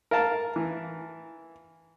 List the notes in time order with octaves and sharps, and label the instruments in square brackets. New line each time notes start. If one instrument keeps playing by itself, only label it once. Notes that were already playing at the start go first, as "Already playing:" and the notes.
[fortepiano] A#4 F5 A5 A#5
E3